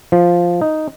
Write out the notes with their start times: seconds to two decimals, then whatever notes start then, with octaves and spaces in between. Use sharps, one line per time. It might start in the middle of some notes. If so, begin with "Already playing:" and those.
0.12 F3
0.61 D#4